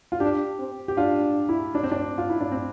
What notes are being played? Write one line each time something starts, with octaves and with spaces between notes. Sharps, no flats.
F4
D4 G4
C4
G4
D4 F4
E4
D4
C4
D4
F4
E4
D4
C4